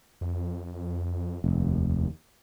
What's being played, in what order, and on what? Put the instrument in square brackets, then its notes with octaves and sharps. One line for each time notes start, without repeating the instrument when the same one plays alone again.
[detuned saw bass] F2
[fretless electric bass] F1 [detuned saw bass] D#2